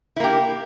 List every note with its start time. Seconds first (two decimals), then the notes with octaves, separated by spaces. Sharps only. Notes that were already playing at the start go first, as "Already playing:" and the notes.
0.16 E4
0.20 A#3
0.24 G4